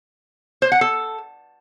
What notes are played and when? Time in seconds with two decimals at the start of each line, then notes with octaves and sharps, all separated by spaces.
0.62 C5
0.72 F#5
0.81 A4